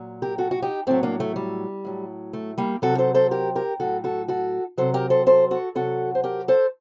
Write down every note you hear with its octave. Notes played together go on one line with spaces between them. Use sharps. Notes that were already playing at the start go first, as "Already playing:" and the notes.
Already playing: A#2 F#3
G4 A#4
F#4 A4
F#4
D#4 G4
A2 F#3 A3 C4
A#3 D4
A3
G3
A2 F#3
A3
G3 A#3
C3 F#3 F#4 A4
A4 C5
A4 C5
G4 A#4
G4 A#4
A2 F#3 F#4 A4
F#4 A4
F#4 A4
C3 D#3 F#3 A4 C5
G4 A#4
A4 C5
A4 C5
F#4 A4
C3 F#3 F#4 A4
C5
G4 A#4
A4 C5